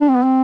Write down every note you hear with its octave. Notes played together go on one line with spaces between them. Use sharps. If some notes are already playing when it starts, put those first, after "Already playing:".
D4
C4
B3
C4